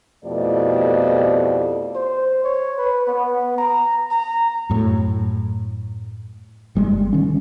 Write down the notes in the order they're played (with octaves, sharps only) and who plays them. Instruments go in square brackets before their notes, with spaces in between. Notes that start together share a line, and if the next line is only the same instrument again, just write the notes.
[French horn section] F2 B2 A3 E4 G4 D5
[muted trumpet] C5
C#5
B4
B3
A#5
A#5
[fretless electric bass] F#2 A2
G1 G3 G#3
D#3 C#4